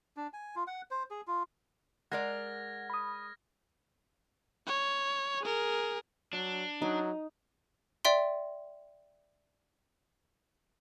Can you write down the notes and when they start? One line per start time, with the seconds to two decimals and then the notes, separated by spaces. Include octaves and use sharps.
0.17 D4
0.33 G#5
0.56 F4
0.67 F#5
0.91 C5
1.11 G#4
1.27 F4
2.12 G#3 A#4 D5 F#5 F6 G#6 A#6
2.90 B5 D#6
4.66 C#5
5.42 G#4 A#4
6.33 F#3 D4
6.82 F#3 D#4
8.05 D5 E5 G5 C6